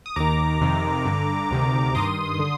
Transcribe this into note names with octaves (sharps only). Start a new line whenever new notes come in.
D#6
D#2 D#3 A#5 D6
F2 C3 D#3
G2 D3
D2 C3 D#3
G2 D#3 C6 D#6
D3